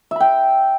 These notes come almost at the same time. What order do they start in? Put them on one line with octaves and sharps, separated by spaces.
E5 B5 G5